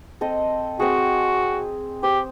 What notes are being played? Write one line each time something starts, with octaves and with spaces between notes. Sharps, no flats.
C4 A4 D#5
C4 F#4 G#4
G4 C5